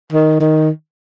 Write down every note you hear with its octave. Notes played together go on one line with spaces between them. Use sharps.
D#3
D#3